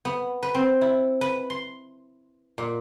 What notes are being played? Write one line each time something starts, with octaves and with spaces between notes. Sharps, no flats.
B3
B4
C4
E4
B4
C6
A#2